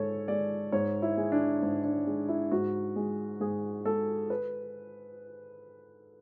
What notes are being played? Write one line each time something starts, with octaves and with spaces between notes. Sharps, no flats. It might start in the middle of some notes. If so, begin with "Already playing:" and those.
Already playing: G#2 G#3 A4 C#5
G#3 D5
G#2 C#5
E4
G#3
D4
G#2
D4
G#3
E4
G#2 F#4
G#3
G#2 G#4
G#3 A4
B4